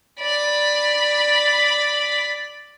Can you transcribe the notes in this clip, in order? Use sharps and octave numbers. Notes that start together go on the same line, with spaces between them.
D5 B5